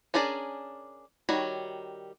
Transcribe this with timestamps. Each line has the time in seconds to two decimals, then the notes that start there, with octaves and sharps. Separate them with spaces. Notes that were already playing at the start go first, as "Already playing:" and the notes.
0.14 C#4 D4 G#4 A#4 D5
1.29 D#3 G3 F#4 C#5